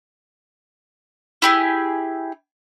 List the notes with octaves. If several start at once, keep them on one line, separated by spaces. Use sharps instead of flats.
E4 G4 G#4